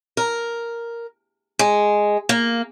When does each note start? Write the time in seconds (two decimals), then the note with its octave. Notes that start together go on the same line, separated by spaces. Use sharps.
0.17 A#4
1.59 G#3
2.29 A#3